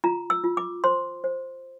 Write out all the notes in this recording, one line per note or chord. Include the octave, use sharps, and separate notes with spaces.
F4 A#5
E6
F4
D6
C5 C6
C5